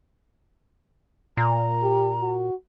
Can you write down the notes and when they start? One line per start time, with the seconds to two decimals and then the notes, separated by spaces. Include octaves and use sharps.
1.37 A#2 A#5
1.82 G4
2.21 F#4